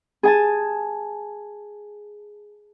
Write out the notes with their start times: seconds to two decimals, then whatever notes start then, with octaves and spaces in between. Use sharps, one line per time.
0.23 G#4 G#5 A5